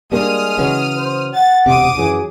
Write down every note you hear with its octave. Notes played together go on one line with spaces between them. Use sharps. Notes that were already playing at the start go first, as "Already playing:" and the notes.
G3 G#3 A#3 D4 D#6 F6
C#3 E3 F#3
C5
F#5 A6
E1 D2 C3 D6 D#6
F#2 E3 F#3 G#4